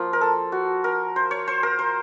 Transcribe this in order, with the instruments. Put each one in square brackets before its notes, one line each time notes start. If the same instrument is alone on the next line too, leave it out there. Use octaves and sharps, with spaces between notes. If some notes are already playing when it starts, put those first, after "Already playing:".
Already playing: [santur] F3 A#3 F4
A#4
A4
F#4
A#4
C5
C#5
C5
A#4
C5